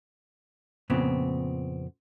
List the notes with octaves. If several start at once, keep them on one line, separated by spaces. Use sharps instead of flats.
F2 A#2 C#3 B3 C4